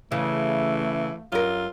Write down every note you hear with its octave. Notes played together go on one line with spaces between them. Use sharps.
C#3 E3 A3
F#2 F4 A#4